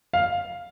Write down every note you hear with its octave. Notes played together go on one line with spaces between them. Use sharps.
F5